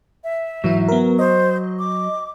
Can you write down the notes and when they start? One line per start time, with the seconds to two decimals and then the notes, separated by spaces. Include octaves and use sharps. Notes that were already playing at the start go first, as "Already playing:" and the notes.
0.24 E5
0.64 G#2 E3 F#3 E4
0.88 B3 A#4
1.19 C5 D#5
1.79 D6